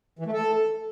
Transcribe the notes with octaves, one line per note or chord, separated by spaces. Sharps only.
E3
A3
A4